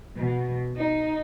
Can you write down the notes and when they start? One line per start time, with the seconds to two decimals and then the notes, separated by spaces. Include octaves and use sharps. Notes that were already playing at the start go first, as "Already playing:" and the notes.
0.17 B2
0.77 D#4